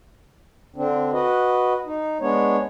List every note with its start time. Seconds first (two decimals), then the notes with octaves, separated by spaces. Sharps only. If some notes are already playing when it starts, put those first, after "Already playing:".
0.76 D3 C4 D4
1.12 F#4 B4 D#5
1.86 D#4
2.21 G#3 B3 D4 C#5